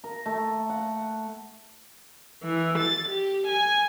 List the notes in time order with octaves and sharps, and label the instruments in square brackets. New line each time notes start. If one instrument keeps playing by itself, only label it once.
[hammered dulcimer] A#4
A3
F#5
[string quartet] E3
A6
G4
G#5